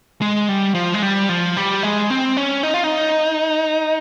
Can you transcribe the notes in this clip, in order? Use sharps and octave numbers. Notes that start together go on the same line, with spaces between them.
G#3
G3
F3
G#3
G3
F3
G3
G#3
C4
C#4
D#4
F4
D#4